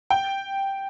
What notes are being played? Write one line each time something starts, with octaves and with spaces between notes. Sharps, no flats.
G5